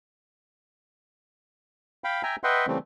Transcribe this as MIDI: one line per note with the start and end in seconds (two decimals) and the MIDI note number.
2.04 2.22 77
2.04 2.22 79
2.04 2.22 83
2.23 2.36 76
2.23 2.36 79
2.23 2.36 80
2.23 2.36 82
2.44 2.66 71
2.44 2.66 75
2.44 2.66 76
2.44 2.66 78
2.44 2.66 79
2.44 2.66 84
2.67 2.78 49
2.67 2.78 52
2.67 2.78 55
2.67 2.78 57
2.67 2.78 60